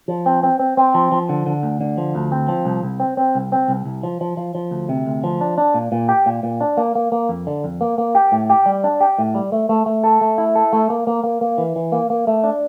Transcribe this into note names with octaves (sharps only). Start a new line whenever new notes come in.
F3
C4
C4
C4
C4
F3
F3
D3
D3
D2
D3
F3
D2
C4
F3
C2
C2
C4
C4
C2
C4
C2
C2
F3
F3
F3
F3
D2
C3
D2
F3
D4
D4
A#2
A#2
G4
A#2
A#2
D4
A#3
A#3
A#3
F2
D3
F2
A#3
A#3
G4
A2
G4
G3
D4
G4
A2
G3
A3
A3
A3
A4
A3
E4
A4
A3
A#3
A#3
A#3
A#3
E3
E3
A#3
A#3
A3
D4